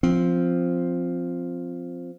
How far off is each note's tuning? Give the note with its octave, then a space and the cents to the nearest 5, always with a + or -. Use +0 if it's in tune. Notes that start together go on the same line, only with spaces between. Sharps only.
F3 +0 C4 +0